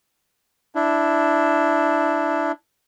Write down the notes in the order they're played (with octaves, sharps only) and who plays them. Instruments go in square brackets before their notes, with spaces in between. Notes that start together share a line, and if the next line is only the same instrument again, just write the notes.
[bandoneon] D4 E4